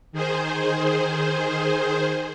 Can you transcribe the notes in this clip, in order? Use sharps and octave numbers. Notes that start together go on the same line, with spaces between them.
D#3 G#4 C5